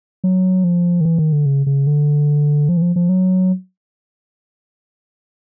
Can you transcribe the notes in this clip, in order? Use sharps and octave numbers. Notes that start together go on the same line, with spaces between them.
F#3
F3
D#3
E3
D#3
D3
C#3
C#3
D3
F3
E3
F3
F3
F#3